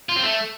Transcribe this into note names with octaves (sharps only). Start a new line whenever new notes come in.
F4
C4
A3